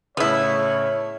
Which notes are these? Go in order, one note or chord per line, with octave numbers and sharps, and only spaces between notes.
A2 C#3 B3 E4 C#5